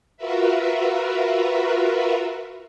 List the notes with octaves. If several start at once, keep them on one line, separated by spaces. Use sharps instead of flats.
F4 F#4 A#4 B4 E5